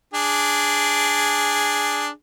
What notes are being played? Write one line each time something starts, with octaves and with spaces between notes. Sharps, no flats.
D4 G#4